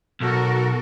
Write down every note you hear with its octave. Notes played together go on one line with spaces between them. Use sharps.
B1 F#4 A4 A#4